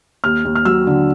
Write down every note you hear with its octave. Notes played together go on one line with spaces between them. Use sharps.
D#2 F6
D#2
F6
F#3 E6
D3